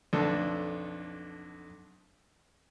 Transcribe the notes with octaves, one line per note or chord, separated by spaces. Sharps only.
B1 F2 D3 D4 A4 A5